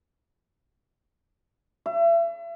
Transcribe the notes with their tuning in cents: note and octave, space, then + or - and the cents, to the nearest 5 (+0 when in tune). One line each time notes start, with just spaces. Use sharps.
E5 +35